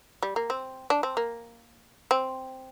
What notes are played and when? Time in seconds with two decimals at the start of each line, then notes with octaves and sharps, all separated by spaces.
0.23 G3
0.36 A#3
0.50 C4
0.90 D4
1.03 C4
1.17 A#3
2.11 C4